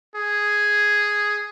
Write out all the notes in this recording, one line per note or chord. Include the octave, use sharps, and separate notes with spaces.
G#4